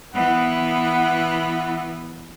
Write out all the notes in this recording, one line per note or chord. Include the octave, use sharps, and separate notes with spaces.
E3 B3 F#5